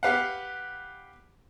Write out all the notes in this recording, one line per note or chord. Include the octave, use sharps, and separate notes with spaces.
G4 B4 F5 F#5